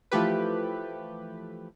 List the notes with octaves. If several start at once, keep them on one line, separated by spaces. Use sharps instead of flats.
E3 F3 A3 G4 B4